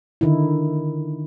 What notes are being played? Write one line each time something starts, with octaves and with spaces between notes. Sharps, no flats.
D3 D#3 D#4 E4